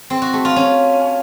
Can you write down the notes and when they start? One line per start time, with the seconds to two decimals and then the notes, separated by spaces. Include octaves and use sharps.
0.10 C4
0.22 F#4
0.33 A3
0.45 F4
0.56 C#4